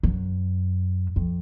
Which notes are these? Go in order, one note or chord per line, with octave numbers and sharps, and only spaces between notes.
F#2
F2